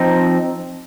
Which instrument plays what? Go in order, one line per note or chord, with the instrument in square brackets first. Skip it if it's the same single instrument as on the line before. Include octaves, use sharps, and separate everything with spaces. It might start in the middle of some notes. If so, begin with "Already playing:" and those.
Already playing: [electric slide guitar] F3 C4 D#4